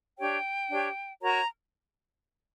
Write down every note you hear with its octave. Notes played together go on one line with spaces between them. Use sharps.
D4 G4 C#5 G5
D4 G4 C#5
F#4 A#4 C#5 A#5